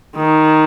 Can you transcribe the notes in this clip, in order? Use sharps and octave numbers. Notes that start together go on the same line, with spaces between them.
D#3